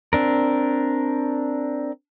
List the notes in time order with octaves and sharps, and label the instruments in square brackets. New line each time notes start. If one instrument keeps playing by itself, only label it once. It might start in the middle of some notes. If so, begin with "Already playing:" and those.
[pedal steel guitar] C4 D4 A#4